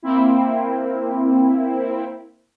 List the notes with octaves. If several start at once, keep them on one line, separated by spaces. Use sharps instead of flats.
A#3 C4 E4